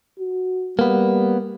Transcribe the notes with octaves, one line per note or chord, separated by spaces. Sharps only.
F#4
G3 A#3 B3